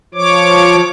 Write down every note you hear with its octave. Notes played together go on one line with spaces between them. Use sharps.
F3 C#5 D6